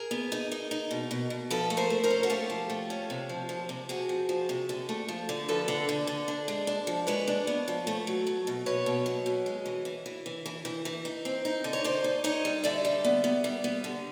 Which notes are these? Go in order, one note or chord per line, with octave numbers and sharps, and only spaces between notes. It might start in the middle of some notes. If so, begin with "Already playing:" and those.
Already playing: G#4 A#4
B3
D#4
D#4
D#4
B2
B2
B2
F3 A4 B4
A3
A#4 C5
A3
A#4 C5
C#4
F#4
A3 F4 G4
F3
A3
C#4
C3
F3
F3
C3
C3 F#4 G#4
F3
F3
C3
D3
A3
F3
D3
F3 A4 B4
D3
D3
D3
D4
G#3
D4
F3
G#3 B4 C#5
D4
B3
F3
A3
F#3
F#3
B2
B2 B4 C#5
B2
F#3
B2
G#3
E3
E3
E3
E3
E3
E3
E3
D#4
C4
D#4
D3
C#5
D3 C5 D5
D#4
D#4 C#5 D#5
G3
D3 D5 E5
G3
B3
B3
G3
B3
D3